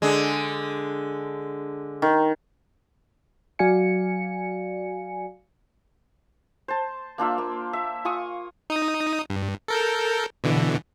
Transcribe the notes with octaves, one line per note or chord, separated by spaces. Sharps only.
D3 G#3
D#3
F#3 F#4 D5 F5 G#5 C#7
C5 A5
A#3 D4 F4 E5
A#3
E5
F4 G#5 C#6 D#6
D#4 D#6
G2
A4 A#4 G6
B2 D3 E3